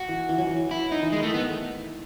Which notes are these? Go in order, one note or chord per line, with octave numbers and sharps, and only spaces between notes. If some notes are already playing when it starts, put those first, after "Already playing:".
Already playing: F#4
E3
E3
F#3
E3
E4
D#4
E3
D#3 G#3
A3
B3